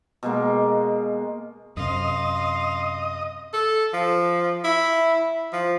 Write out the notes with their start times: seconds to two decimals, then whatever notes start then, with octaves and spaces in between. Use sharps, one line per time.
0.23 B2 G#3 A#3
1.77 F#2 C3 D#5 F5 C6
3.54 A4
3.94 F3
4.64 E4
5.53 F3